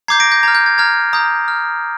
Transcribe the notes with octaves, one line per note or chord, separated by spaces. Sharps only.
A#5 D6 G6 G#6 C7
A#6 D7
G6 A#6
A#5 F6 G#6
G6
G#6
A#5 F6 G#6
A#5 D#6 G6
F6